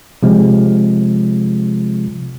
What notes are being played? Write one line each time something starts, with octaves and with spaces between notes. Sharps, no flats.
C3 F3 G#3